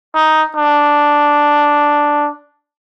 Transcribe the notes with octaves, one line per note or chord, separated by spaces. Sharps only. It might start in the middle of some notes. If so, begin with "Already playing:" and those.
D#4
D4